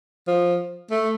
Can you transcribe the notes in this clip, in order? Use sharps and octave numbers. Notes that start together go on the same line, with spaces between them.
F3
A3